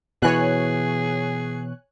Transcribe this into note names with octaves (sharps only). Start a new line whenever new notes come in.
B2 E3 G#4 C#5 G#5 F#6